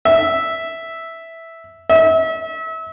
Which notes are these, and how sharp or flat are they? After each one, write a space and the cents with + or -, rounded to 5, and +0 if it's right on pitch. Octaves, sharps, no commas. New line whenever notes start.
E5 -5
E5 -35